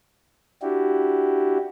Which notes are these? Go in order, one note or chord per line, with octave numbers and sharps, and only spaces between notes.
D4 E4 F#4 G4